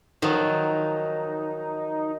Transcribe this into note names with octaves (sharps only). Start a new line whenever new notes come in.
D#3 F3 F#3 D#4